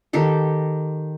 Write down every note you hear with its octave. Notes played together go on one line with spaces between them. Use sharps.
D#3 G4 A4